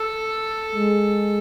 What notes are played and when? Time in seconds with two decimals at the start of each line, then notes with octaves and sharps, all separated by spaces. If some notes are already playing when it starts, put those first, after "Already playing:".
Already playing: A4
0.75 G#3